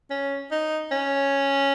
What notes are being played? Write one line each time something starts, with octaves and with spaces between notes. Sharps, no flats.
C#4
D#4
C#4